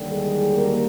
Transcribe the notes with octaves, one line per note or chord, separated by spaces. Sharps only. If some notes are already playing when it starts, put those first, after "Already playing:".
Already playing: D#2 D3 G3
G#3 G#4
A#3 A#4